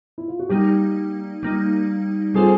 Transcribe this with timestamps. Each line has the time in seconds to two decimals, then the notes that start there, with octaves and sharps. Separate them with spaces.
0.18 E4
0.28 F4
0.39 F#4
0.49 G3 A#3 D#4 G4
1.43 G3 A#3 D#4
2.34 G3 C4 F4 G#4 A4 C5